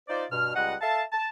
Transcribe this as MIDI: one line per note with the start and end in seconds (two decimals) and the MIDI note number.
0.09 0.25 63
0.09 0.25 65
0.09 0.25 72
0.09 0.25 74
0.31 0.52 43
0.31 0.52 47
0.31 0.52 89
0.55 0.75 37
0.55 0.75 55
0.55 0.75 75
0.55 0.75 78
0.81 1.03 69
0.81 1.03 76
0.81 1.03 77
0.81 1.03 81
1.12 1.28 81